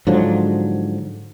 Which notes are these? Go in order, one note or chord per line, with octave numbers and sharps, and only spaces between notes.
G#2 D3 F3 F#3